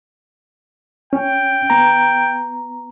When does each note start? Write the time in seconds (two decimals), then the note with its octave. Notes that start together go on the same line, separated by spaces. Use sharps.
1.13 C#4 G5
1.70 B3 A#5